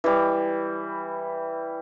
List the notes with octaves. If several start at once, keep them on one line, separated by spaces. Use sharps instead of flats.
E3 G3